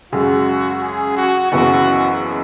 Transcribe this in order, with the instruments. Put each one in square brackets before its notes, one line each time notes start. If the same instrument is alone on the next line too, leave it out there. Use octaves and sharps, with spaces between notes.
[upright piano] F#2 C#3 G#3 [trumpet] F#4
[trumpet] G#4
F#4
[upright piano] F#1 F#2 C#3 E3 B3 [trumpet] F#4